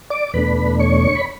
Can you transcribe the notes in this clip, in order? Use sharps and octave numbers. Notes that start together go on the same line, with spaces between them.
D5 D6
E2 B2 A3 D4 B4 B5
C#5 C#6
B5